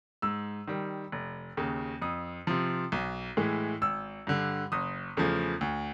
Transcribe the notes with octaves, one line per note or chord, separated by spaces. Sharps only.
G#2 E6
D#3 G3
F1
D#2 C#3
F2 D#6
C3 F3
B1
A2 E3 G#3
G#1 E6
G2 D3
F#1 D#6
E2 C#3 F3 A3
D2